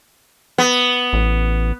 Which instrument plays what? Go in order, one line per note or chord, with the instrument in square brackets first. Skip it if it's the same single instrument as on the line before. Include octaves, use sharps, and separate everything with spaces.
[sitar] B3
[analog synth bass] A1